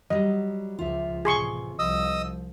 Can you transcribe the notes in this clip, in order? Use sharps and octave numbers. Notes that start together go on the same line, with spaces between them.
F#3 G3 D#5
C#2 F3 F4 E5
A1 C3 G#4 C6 C#6
C2 F3 D#5 D#6 E6